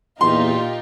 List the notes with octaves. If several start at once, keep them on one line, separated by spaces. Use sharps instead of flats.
E2 A#2 D#4 F4 G4 C6